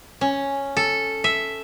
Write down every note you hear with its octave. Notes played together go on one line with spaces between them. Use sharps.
C#4
A4
E5